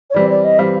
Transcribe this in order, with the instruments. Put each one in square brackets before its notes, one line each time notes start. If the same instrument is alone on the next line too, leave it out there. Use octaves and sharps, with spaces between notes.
[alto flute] C#5
[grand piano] E3 G3 C4 [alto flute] D5
[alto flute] D5
D#5
[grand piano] E3 G3 C4 [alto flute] F5